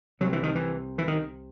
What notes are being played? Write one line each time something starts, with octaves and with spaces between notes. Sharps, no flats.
C2 C3 F#3
E3
D#3
E3
E3
D#3